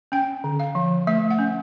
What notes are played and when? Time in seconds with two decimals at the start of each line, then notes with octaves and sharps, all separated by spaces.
0.12 C#4 G5
0.44 D3
0.60 F5
0.75 F3
1.07 A3 E5
1.31 F#5
1.39 C#4